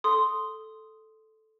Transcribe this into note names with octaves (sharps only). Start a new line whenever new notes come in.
A4 C6 D#6